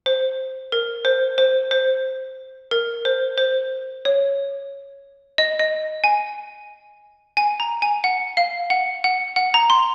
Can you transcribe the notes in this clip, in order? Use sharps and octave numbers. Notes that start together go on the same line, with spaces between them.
C5
A#4
C5
C5
C5
A#4
C5
C5
C#5
D#5
D#5
G#5
G#5
A#5
G#5
F#5
F5
F#5
F#5
F#5
A#5
C6